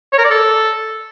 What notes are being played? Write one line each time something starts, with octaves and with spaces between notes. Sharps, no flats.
C#5
A#4
D5
A4